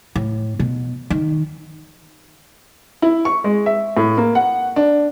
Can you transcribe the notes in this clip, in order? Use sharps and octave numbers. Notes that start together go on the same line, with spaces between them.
A2
B2
D#3
E4
C#6
G#3
E5
A2
A#3
F#5
D4